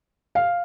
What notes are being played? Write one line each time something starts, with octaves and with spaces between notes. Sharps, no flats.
F5